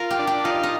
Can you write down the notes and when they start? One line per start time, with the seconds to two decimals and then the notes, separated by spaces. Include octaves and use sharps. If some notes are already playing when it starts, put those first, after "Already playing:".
Already playing: F4 A#4
0.11 G4
0.19 D4
0.27 G4
0.44 D#4 F4
0.63 D#4